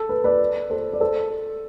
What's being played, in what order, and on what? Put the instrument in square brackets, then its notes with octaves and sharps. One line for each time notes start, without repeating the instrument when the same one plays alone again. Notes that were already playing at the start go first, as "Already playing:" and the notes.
Already playing: [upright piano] A4
B4
B4 D5
A4 C5
D5
A4 C5